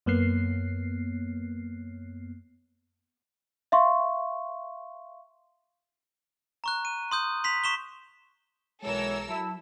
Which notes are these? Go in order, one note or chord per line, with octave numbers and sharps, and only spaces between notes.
F#2 A#3 B3 C7
E5 F5 C6 C#6
A#5 C#6 F#6
D#7
C6 D#6 G6
C6 B6 F7
C#6 B6 E7 F7 G7
B1 B2 E3 G#3 A4 A#4 C#5 E6
F#3 E4 A5